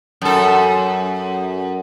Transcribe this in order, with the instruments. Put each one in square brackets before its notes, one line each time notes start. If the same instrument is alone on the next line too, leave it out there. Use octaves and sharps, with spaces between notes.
[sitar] F#2 A4